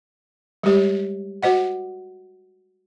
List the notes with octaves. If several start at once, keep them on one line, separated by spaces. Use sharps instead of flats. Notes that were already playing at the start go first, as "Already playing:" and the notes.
G3 G#3 G4 C#5
F#4 C5 D#5 F#5